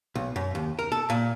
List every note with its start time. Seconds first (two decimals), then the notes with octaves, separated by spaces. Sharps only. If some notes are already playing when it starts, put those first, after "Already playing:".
0.15 B1
0.36 F#2
0.55 D#2
0.79 A#4
0.92 A4
1.10 A#2